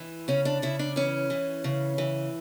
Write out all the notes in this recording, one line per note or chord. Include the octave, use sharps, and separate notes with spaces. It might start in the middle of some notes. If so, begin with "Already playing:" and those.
Already playing: E3
C#3 C#4
D4
C#3 E4
D4
E3 C#4
E3
C#3
E3